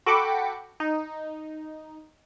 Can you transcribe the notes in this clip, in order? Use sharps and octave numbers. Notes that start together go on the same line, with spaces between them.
F#4 A4 G5 B5 D6 C#7
D#4